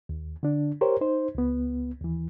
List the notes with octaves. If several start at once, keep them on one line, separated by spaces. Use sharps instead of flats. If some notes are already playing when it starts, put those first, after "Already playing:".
D#2
D3 D4
G4 A#4 C5 C#5
D#4 C5
C#2 B3
D#2 E3